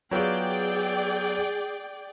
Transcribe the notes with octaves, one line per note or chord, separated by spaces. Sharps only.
F#3 B3 F4 G#4 D5 G5